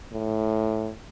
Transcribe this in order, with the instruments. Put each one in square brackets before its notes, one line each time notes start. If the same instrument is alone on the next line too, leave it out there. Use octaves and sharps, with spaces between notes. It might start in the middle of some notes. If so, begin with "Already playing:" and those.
[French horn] A2